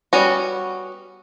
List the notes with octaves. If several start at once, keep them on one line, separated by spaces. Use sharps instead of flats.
G3 B3 C#4 F#4